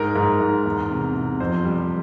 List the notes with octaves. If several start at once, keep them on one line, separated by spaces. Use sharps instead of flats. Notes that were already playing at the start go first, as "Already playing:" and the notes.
Already playing: G#2 A#4
G#2
G#2
E2
C3
C3
F2 C5
G3